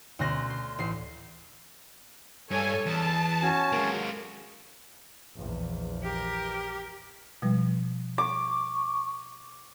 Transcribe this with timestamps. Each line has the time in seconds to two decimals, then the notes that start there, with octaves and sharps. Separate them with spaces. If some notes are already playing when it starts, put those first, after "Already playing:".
0.19 D2 B2 C#4 C6 F#6 A#6
0.50 C6
0.79 A1 C7
2.51 G2 A4 C#5 G#5
2.86 E2 A5
3.43 C#4 F#4 G#5
3.72 G#3 A#3
5.34 A#1 E2
6.03 G4 A#4
7.42 B2 F3 G3
8.18 C#6 D6